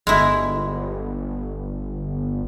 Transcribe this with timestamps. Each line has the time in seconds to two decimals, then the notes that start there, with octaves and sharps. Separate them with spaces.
0.07 G1 G#3 E4